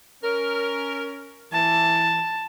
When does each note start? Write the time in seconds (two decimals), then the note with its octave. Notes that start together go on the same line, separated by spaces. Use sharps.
0.23 C#4 A#4
1.53 E3 A5